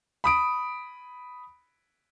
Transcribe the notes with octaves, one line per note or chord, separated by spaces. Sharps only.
B5 D#6 D7